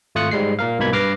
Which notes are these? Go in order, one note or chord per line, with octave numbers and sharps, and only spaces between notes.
G#1 A3 F4 D#6 F#6 C#7
G#2 G3 G#3 C7
A#2 A#4 F5
C2 G#2 B2 A#3 B5 G#6
G2 B4 D6 F6 A#6 C7